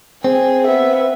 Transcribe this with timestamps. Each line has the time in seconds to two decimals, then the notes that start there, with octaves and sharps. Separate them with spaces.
0.24 C4 G#4
0.66 B3 E5